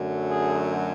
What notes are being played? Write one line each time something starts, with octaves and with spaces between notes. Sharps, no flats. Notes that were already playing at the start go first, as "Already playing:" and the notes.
Already playing: F#2 D3 F#3 A3
G#4